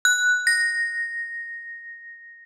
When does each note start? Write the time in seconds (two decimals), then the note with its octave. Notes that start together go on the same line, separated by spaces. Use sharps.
0.05 F#6
0.47 A#6